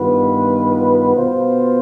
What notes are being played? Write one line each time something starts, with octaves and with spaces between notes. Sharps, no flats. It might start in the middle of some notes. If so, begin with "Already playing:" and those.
Already playing: G2 D#3 B3 F4 B4
B2 B3 F4 C5